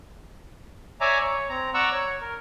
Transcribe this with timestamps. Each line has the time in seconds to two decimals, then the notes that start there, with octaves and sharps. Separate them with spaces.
1.01 C#5 D5 E5 G#5 A#5 D6
1.21 C#5
1.49 C4 A#5
1.74 D5 F#5 A#5 C#6 E6
1.92 C#5
2.21 A#4